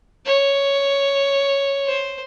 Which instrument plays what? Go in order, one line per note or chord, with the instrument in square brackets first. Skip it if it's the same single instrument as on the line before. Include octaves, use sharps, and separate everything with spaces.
[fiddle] C#5
C5